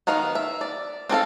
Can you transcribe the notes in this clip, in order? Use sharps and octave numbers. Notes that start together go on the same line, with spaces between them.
D#3 B3 A#4 F5
E5
D5
C4 D4 A4 F5